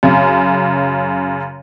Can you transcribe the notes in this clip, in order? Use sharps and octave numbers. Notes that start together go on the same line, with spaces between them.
F#2 C#3